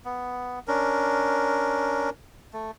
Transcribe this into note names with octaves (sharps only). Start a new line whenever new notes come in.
B3
C#4 D4 A#4
A3